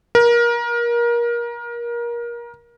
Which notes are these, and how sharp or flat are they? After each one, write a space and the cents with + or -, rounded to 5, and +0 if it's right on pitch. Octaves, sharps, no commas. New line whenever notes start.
A#4 +25